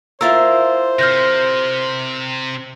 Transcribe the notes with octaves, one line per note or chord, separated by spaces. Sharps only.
E4 F4 A#4 C5 E6
C3 F6 G6 A#6